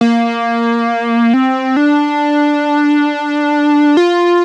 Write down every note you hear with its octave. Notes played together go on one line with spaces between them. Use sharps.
A#3
C4
D4
F4